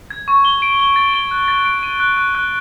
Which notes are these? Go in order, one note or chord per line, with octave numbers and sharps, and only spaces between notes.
G#6
C#6
G7
D7
G7
A6
G7
F#6
A6
D7
D#7
F#6
F#6
F#6